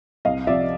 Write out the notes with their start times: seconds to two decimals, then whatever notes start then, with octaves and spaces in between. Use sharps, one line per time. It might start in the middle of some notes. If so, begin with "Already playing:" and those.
0.25 C2 D#5 F5
0.47 C3 F3 D5 E5